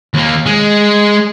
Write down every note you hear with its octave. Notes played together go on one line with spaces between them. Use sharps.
D#2 A#3
G#3